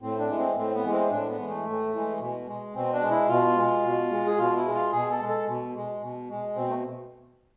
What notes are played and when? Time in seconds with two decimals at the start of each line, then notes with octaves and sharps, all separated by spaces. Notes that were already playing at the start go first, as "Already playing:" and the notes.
0.01 A2 C4
0.19 D4
0.28 E3 G#3
0.38 C4
0.55 A2 C4
0.74 B3
0.83 E3 G#3
0.92 C4
1.11 A2 D4
1.29 B3
1.38 E3 G#3
1.47 A3
1.65 A2
1.92 E3 G#3
2.20 B2
2.47 G#3
2.75 B2 C4
2.93 D4
3.01 G#3
3.11 E4
3.29 B2 F4
3.57 G#3
3.84 B2
4.11 G#3
4.27 G#4
4.38 B2 F4
4.56 E4
4.65 G#3
4.74 F4
4.92 B2 G#4
5.11 A4
5.20 G#3
5.29 A4
5.47 B2
5.75 G#3
6.01 B2
6.29 G#3
6.56 B2 C4
6.69 A3